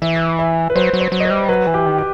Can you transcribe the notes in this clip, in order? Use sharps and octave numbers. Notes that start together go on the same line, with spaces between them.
E3 E5
E5
B4
F#3 C5
F#3
C5
F#3
D#5
C5
G3
F#3 B4
E3
G4
D#3
G4